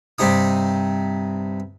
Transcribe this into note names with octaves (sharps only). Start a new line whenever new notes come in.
G2 C3 D#4 D#6